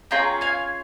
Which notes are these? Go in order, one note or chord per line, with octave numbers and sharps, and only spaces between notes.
C#4 F4 G#4 G5 A#5
F5 G#5